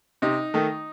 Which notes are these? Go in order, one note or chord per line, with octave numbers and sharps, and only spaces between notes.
C3 D#4
D#3 A3